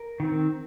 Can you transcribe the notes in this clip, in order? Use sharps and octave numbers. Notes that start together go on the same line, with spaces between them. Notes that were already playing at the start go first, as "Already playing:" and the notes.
Already playing: A#4
D#3 C4